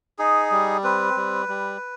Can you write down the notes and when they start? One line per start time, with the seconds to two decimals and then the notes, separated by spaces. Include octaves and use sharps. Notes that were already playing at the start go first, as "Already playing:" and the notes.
0.19 D#4 G#4
0.51 G3
0.84 C4 B4
1.17 G3
1.48 G3